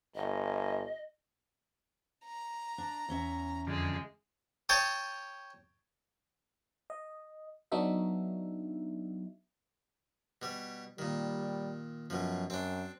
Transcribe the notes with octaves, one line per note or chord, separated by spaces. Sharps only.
G1 D#5
A#5
D4
E2 C#4 E5
F2 D3 G#3
C#5 G5 A5 D#6
D#5
F#3 B3 D4 D#4 F#4 E5
B2 G3
A#2 D#3 G3
F#2 B2 F3
F#2 C4 D4